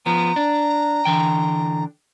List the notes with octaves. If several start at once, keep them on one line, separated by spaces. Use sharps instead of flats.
F3 B3 A#5
D4
D3 E3 G5